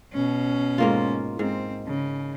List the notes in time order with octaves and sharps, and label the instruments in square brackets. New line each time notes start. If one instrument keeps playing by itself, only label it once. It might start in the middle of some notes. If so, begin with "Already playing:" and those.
[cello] B2 C#4
[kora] G#2 A#3 F4
[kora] G#2 [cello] C4
[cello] C#3